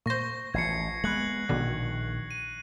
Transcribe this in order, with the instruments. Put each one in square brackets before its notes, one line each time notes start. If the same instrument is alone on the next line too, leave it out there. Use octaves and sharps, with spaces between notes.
[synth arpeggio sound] A#2 C5 [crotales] C#6 A#6
[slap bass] A1 F3 [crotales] G#6 C7 C#7
[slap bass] G#3 B3 [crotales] F#6 F#7
[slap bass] A#1 D#3 [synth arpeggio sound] B2 D3
[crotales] D#7